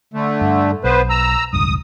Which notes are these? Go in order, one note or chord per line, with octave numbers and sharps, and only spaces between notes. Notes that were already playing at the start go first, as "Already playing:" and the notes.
D3 A3
G2
B1 B3 B4 C5
A#5 E6
E1 C#2 G2 D#6